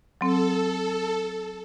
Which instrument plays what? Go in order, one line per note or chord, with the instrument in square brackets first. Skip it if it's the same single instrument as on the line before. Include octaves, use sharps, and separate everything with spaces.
[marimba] F#3 C4 [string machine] A4